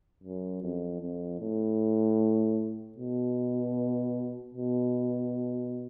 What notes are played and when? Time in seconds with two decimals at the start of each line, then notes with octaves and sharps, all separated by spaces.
0.23 F#2
0.62 F2
1.02 F2
1.40 A2
2.97 B2
4.54 B2